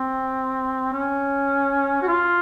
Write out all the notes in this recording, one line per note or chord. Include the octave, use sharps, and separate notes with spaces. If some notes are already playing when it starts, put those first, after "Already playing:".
Already playing: C4
C#4
F#4
F4